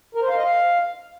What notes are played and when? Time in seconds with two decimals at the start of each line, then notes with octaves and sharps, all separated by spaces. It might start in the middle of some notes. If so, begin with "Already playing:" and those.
0.15 A#4
0.22 C5
0.29 F5
0.37 D#5
0.44 F5